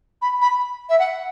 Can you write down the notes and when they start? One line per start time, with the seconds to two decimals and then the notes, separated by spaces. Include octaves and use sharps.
0.22 B5
0.42 B5
0.89 E5
0.99 F#5